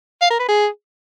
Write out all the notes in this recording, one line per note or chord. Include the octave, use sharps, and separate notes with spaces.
F5
A#4
B4
G#4